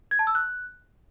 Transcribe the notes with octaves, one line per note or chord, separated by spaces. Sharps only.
G#6
A5
E6
F#6